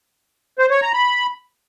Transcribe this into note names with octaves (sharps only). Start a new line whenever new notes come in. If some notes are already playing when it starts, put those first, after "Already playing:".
C5
C#5
A#5
B5